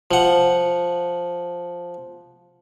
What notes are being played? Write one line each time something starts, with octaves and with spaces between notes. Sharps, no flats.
F3 F#5